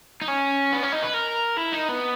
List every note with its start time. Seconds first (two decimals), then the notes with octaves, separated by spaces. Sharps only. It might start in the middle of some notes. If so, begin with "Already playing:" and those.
0.22 D#4
0.28 C#4
0.72 B3
0.83 C#4
0.92 D#4
1.03 B4
1.14 A#4
1.57 E4
1.73 D#4
1.89 B3